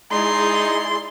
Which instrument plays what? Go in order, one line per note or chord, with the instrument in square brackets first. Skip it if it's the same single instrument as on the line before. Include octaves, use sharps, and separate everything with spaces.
[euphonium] G#3 [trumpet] D#4 [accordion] E4 G#4 D5 [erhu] C6